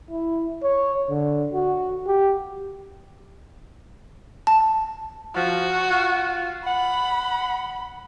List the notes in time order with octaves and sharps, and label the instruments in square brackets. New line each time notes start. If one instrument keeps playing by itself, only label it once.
[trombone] E4
C#5
D3
F#4
G4
[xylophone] A5
[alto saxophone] F3 [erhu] F#4
[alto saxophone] F4
[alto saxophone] F#5 [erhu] B5